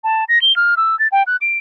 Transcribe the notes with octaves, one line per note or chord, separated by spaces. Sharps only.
A5
A#6
G7
F6
E6
A6
G5
F#6
D7